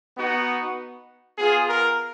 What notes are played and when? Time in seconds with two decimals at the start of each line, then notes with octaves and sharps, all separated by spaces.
0.17 B3 D#4 F#4
1.38 B3 F4 G#4
1.69 A#4